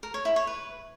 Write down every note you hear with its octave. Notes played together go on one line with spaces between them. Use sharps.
A#4
C#5
E4
C#5
B4